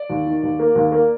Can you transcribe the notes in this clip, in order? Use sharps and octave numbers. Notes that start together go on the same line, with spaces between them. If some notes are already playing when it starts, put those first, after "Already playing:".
Already playing: D5
D#2
D#3
D#2
A#3
D#2
A#3